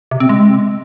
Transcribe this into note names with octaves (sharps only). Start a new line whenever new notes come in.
C3
C4
G#3